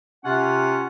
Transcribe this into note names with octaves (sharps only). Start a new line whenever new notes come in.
C3 C#4 F4 F#5